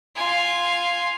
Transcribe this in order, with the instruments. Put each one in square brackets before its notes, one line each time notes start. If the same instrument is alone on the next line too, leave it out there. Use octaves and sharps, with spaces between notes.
[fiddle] F4 G#5